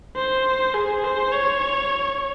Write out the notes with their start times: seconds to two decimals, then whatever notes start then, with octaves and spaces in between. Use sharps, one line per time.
0.17 C5
0.75 G#4
1.05 C5
1.32 C#5